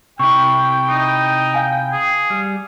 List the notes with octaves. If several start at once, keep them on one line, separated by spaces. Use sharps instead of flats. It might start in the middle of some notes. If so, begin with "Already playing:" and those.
C3 E4 G5 C#6
D#4
F5 G#5
G#4
G3